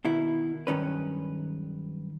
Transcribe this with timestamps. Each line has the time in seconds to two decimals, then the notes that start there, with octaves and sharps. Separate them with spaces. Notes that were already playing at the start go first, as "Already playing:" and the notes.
0.05 B2 D#3 E4
0.67 B1 G2 D#3 C#4 B4